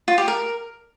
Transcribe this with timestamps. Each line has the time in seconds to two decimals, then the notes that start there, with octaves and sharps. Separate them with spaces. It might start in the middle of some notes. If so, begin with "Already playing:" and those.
0.08 F4
0.18 G4
0.28 A#4